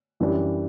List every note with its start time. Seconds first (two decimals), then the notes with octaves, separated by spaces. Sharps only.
0.20 F#2 E3 G3 D4